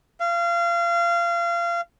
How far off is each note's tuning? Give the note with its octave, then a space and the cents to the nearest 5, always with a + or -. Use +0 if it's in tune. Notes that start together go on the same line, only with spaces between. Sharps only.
F5 -30